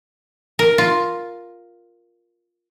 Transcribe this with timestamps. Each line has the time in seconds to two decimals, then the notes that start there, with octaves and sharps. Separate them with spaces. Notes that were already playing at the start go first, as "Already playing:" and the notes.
0.59 A#4
0.78 F4